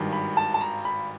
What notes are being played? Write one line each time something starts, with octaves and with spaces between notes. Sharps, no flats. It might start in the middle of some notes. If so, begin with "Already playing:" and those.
Already playing: G#1 G2 D#3
B5
A5
A5
A#5
B5